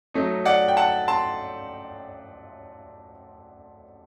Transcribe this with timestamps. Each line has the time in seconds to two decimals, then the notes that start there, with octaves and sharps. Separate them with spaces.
0.14 F#3 A3 D#4
0.45 D5 F#5
0.68 G5
0.77 F#5 A5
1.08 A5 C6